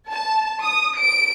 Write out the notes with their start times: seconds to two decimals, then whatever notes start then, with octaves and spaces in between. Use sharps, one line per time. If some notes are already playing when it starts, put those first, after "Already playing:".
0.10 A5
0.62 D#6
0.97 D7